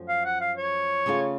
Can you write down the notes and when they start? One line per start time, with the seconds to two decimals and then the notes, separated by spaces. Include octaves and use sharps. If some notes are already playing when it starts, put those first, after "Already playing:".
Already playing: F#2 F3 A3
0.09 F5
0.25 F#5
0.41 F5
0.57 C#5
1.06 C#3 A3 C#4 F4